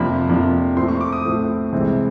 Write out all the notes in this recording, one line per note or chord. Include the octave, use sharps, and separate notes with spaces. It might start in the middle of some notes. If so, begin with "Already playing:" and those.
Already playing: F2 C3 F3 A#3 D4 B5
F2 C3 F3 A#3 D4
A2 F3 A3 C4 C6
C#6
D6
D#6
A2 F3 A3 C4
C2 C3 E3 G#3 C4